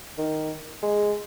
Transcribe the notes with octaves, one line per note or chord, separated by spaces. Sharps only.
D#3
G#3